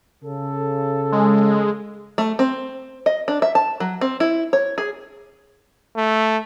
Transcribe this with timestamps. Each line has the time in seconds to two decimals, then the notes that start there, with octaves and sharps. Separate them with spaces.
0.23 C#3 A4
1.12 G#3
2.18 A3
2.39 C4
3.06 D#5
3.28 D4
3.42 E5
3.55 A5
3.80 F#3
4.01 C4
4.20 E4
4.53 C#5
4.78 G#4
5.97 A3